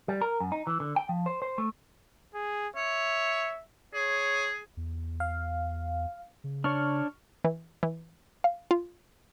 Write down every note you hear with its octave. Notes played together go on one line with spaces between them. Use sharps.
G3
A#4
F#2
D#4
E3
D3
G5
F3
C5
C5
A3
G#4
C#5 E5
G#4 C#5
E2
F5
C#3
D4 C#5 C#6 F6
E3
E3
F5
F4